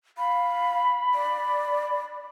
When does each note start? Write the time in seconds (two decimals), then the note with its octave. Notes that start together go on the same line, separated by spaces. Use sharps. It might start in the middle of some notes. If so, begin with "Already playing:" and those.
0.18 F5 B5
1.14 D5